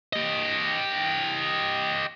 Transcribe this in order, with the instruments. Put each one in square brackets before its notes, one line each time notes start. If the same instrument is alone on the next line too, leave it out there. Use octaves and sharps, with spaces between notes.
[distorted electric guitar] G4 D#5